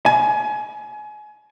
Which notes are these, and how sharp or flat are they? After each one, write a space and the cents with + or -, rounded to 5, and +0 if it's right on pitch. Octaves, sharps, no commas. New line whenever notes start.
G#5 +30